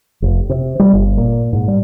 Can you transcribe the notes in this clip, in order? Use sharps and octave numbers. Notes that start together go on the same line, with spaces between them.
F1
C3
G3
G1
A#2
G#2
G3